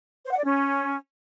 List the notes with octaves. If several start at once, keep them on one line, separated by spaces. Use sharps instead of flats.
C5
F#5
D5
C#4